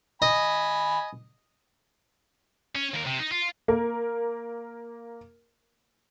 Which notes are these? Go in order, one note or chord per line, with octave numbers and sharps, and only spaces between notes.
D#5 G#5 B5
C#4
D#2 A#4
C3
D#4
F4
A#3 A#4